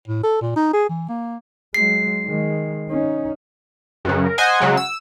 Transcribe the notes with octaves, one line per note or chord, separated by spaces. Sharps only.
A2
A4
A#2
D#4
G#4
E3
A#3
F#3 G#3 C7
D#3 G#3
C#4 D#4
C#2 F#2 C#3 F#5
A#4
C5 D#5 F#5 G#5
C#3 F#3 G#3
E6